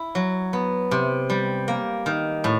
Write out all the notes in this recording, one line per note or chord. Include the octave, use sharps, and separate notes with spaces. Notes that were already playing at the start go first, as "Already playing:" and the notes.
Already playing: E4
F#3
B3
C3
G3
A#3
D#3
A2